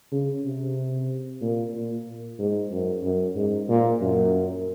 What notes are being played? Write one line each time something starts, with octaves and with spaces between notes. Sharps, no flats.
C#3
C3
A#2
A#2
G#2
F#2
F#2
G#2
A#2
F#2